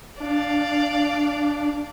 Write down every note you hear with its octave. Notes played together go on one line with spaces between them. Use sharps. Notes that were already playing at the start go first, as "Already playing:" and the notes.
D4 D5 F5